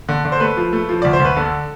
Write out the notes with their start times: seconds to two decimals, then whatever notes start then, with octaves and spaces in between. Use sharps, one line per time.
0.09 D3
0.25 D3
0.32 C5
0.40 A3 B4
0.57 F3
0.73 A3
0.89 F3
1.02 D2 D5
1.13 C5
1.20 D2 B4
1.36 D3 A4